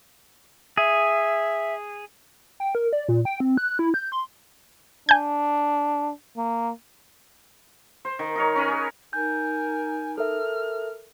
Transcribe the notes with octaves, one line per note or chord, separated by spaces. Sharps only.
G#4 E5
G5
A#4
D5
A#2
G5
C4
F#6
E4
G6
C6
D4 G#5 G6
A#3
C5
D#3
D#4 A#4 C#5
C#4 A#4 B4 G#5
G#4 C#5
D#4 A#4 G#5 G6
A4 A#4 E5 F6